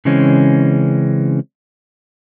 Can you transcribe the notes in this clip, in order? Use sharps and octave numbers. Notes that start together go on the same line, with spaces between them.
C#3 E3 G#3 C4 C#4